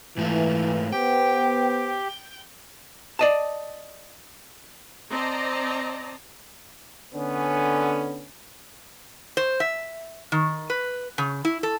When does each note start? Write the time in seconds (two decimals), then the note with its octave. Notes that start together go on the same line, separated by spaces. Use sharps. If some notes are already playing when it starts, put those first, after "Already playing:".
0.17 G#2 E3 A3 F4
0.92 B3 G4 C5 G5
3.19 D5 D#5 A5
5.11 C4 D5 D#5 A5 A#5
7.14 D3 B3 C#4
9.37 C5
9.60 E5
10.32 D#3
10.70 B4
11.18 C#3
11.45 E4
11.63 A4